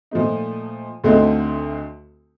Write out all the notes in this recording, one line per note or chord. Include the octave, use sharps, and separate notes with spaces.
A#2 F3 A3 D#4
D2 D3 A3 C4 D#4